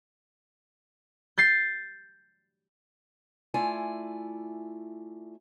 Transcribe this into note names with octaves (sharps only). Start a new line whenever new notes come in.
G6 A6 C7
A3 E4 F4 D5 G#5